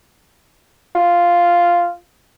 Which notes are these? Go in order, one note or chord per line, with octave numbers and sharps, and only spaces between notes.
F4